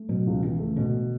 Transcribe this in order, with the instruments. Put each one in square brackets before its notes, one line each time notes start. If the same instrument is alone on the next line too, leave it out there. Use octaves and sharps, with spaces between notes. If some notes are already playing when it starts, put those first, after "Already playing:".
Already playing: [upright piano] A3
[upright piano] B2 [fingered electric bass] F#3
[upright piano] C#2
[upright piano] C#2 [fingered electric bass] E3
[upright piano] A3
[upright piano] B2 [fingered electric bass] D3